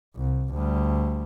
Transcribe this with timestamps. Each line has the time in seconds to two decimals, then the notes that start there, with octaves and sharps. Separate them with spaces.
0.16 C2
0.54 D2 G3